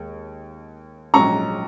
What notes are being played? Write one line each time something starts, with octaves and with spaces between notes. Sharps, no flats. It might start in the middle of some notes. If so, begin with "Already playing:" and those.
Already playing: D#2 G#3
A#1 G#2 F#3 C#4 A#5 C#6